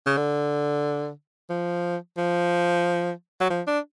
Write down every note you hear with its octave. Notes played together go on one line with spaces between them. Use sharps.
C#3
D3
F3
F3
F#3
F3
D4